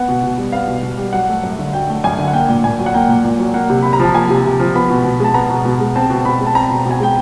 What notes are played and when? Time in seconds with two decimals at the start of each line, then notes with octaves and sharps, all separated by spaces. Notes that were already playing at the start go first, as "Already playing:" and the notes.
Already playing: B3 F#5
0.08 B2
0.23 B2
0.38 G3
0.52 B3 F5
0.68 B2
0.83 B2
0.98 G3
1.13 F#3 F#5
1.28 A3
1.43 F#2
1.59 D3
1.73 F#3 G5
1.89 A3
2.04 F#2 G#5
2.18 D3
2.28 F#5
2.33 A#3 G5
2.49 A#2
2.64 A#2 G#5
2.79 F#3
2.86 F#5
2.94 A#3 G5
3.09 A#2
3.24 A#2
3.39 F#3
3.54 A#3 F#5
3.70 C3
3.83 C3 B5
3.93 A#5
4.00 F3 A5
4.14 A#3 G#5
4.30 C3
4.45 C3
4.60 F3
4.74 B3 B5
4.90 B2
5.04 B2
5.20 G#3 A5
5.34 B3 A#5
5.50 B2
5.65 B2
5.80 G#3
5.96 C4 A5
6.10 B2
6.25 B2 B5
6.41 G#3
6.47 A5
6.55 C4 A#5
6.70 B2
6.85 B2
6.91 G#5
7.00 G#3 G5